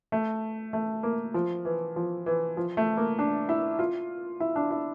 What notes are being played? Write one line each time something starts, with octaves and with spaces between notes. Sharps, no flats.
A3
A3
A#3
F3
E3
F3
E3
F3
A3
A#3
D4
E4
F4
E4
D4
E4